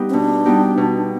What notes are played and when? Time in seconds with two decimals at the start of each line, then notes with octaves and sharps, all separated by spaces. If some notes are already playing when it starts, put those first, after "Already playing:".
Already playing: G3 B3 D#4 G4
0.09 C4
0.14 B2 D4
0.45 G3 B3 D#4 G4
0.77 B2